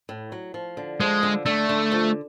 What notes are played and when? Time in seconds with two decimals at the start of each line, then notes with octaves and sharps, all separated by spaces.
0.09 A2
0.32 F#3
0.54 F3
0.77 D3
1.00 F3 G#3
1.23 D3
1.46 D3 A3
1.69 D3
1.92 F3